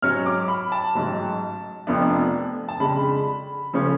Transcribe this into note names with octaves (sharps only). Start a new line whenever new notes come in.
G#2 F#3 C#4 F6
D6
B5
A5
A1 G#2 F#3
F1 F2 F3 B3 D4
A5
F2 C#3 G#3 D4 B5
C#3 F3 A3 C#4